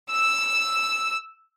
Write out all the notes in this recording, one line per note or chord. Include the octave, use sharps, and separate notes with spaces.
E6